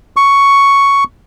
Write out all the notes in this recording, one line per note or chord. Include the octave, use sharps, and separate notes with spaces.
C#6